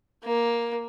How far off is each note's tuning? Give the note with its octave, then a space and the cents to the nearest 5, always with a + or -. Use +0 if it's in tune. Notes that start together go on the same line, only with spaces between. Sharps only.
A#3 +10